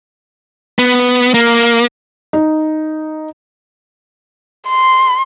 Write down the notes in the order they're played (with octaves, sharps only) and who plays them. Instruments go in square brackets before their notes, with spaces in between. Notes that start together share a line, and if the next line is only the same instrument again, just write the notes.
[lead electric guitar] B3
A#3
[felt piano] D#4
[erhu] C6